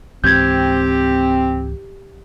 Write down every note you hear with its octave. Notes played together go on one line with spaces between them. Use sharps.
C#2 G#2 E3 C4 G4 G6 G#6